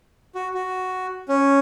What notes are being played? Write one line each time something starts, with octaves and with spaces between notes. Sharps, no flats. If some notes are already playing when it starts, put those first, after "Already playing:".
F#4
F#4
C#4